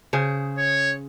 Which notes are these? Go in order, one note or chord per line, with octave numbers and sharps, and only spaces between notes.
C#3 G#4 C5
C#5